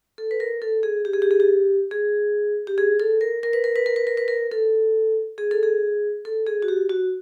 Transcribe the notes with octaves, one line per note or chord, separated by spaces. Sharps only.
A4
B4
A#4
A4
G#4
G4
G#4
G4
G#4
G4
G#4
G4
G#4
A4
A#4
A#4
B4
A#4
B4
A#4
B4
A#4
B4
A#4
A4
G#4
A4
G#4
A4
G#4
F#4
G4
F#4